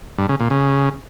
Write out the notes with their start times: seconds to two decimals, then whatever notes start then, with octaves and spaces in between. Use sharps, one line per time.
0.18 G2
0.29 C#3
0.40 A#2
0.50 C#3